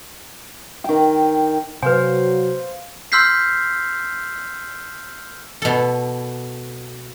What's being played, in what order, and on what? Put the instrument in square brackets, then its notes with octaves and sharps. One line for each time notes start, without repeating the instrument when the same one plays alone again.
[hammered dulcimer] D#3 G5
[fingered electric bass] C3 [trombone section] F#3 [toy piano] B4 G#5 [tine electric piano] C5 F5
[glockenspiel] C6 E6 F6 G6 B6 C7
[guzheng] B2 A4